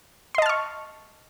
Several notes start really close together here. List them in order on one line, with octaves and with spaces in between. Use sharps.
C6 D#5 A5 F6 C#6